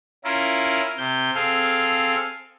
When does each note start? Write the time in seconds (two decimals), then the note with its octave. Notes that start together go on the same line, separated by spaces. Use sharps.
0.24 C#4 E4 F4 A#4
0.97 C3 G6
1.35 C4 G#4 A4 F5